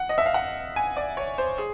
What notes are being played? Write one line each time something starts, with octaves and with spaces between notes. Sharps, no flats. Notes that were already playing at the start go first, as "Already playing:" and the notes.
Already playing: F#5
D#5
E5
F5
F#5
G#5
D5
C#5
C5
G#4